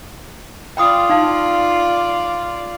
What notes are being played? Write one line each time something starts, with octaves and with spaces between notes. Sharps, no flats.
F4 D5 G5 B5 D#6
D#4 F5 A5